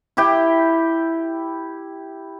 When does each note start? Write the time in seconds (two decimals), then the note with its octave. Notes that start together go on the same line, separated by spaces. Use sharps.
0.17 E4 G4 G5